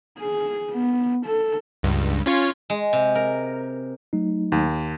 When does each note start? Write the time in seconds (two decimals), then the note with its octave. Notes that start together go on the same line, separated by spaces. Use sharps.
0.18 G#4
0.71 B3
1.26 A4
1.83 C#2 G2
2.26 C#4 F4 C#5
2.70 G#3
2.93 C3
3.15 A#4
4.13 F#3 A3 D#4
4.52 D#2